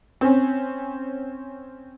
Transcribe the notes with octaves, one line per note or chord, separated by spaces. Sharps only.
C4 C#4